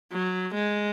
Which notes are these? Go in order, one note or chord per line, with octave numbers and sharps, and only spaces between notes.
F#3
G#3